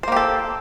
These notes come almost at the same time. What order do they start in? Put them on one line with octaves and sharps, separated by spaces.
C5 A#3 G4 A4